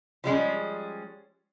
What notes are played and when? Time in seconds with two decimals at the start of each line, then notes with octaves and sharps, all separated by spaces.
0.24 F3 G3 G#3 C#4